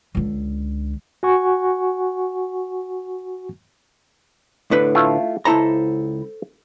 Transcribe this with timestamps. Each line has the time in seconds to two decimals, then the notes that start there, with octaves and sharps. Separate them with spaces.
0.15 C#2 D3
1.23 F#4 F#5 G#5 C#6
4.71 A2 D3 B4
4.95 A3 E4 F4
5.45 C#2 E4 A4 C5 A#5